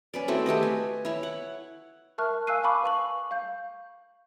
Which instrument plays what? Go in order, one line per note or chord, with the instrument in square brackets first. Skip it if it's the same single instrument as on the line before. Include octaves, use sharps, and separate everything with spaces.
[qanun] C#4 B4 D5
A3 C4 E4 F#4
A3 G4 B4 D#5
G#5
E4 C#5
F#5
[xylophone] A#4 E5 A5 C#6 F6 F#6
F5 G#5 E6 F#6 C7 D#7
F5 G#5 A5 B5 C#6 D6
B4 F5 C#6 F#7
F5 G6